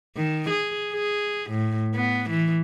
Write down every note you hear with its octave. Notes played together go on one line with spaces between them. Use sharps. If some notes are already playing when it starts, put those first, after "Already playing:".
D#3
G#4
G#4
A2
B3
E3